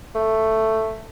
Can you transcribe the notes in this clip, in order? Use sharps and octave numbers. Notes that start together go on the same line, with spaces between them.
A3